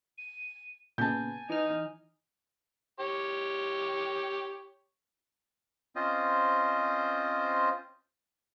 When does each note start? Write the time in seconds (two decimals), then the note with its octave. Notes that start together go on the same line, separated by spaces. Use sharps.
0.18 D#7
0.98 A#2 C#3 B3 G#5 A5 G6
1.50 E3 D#4 F6
3.00 G4 C#5
5.96 C4 C#4 F4 C5 D#5